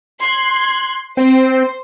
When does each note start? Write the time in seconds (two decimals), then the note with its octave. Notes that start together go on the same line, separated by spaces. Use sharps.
0.21 C6 F#6 G#6
1.17 C4 C5